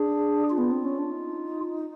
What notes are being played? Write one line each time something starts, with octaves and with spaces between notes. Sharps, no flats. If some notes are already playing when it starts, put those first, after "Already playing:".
Already playing: D4 G#4
F4
B3
C4
C#4
D4
D#4